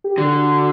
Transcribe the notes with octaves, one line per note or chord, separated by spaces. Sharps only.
G4
D3 F#4